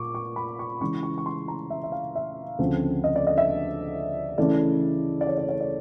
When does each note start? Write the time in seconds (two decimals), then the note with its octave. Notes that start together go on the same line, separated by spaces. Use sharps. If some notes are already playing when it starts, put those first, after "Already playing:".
Already playing: A#2 C#6 D6
0.15 C#6
0.36 B5
0.59 C#6
0.81 C#3 E3 G#3 C#6
1.03 C#6
1.18 C#6
1.26 C6
1.48 A#5
1.70 E5
1.84 E5
1.92 F5
2.15 E5
2.59 D2 C#3 F3 A3 C4
3.04 D#5
3.16 D5
3.27 D#5
3.38 E5
4.38 C#3 E3 A3 D5
5.21 D5
5.27 C#5
5.37 C#5
5.49 C#5
5.60 D5